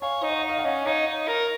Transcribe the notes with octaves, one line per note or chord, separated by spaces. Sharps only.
C#5 F5 G#5
D#4
D#5 F#5
D#4 D#5
F5
D#5 F#5
C#4
D#4 C#5 F5
D#4
A#4